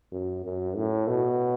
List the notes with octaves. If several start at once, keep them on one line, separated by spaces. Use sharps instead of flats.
F#2
F#2
A2
B2